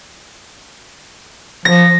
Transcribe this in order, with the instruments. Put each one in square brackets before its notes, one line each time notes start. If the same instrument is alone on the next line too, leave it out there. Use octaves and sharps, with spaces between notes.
[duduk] F3 [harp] A#6